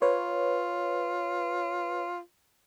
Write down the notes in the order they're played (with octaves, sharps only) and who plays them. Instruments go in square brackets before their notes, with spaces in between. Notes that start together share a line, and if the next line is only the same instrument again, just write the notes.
[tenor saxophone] F4 [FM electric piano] B4 C#5